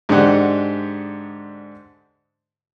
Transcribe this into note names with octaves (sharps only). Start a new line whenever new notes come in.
G#2 D3 G#3 D4 G4 F#5